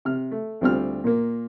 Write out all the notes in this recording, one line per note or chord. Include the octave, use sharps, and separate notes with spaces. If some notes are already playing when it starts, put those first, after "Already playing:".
C3 F6
A3
D2 D3 G3 C4 F4 F6
A#2 A#3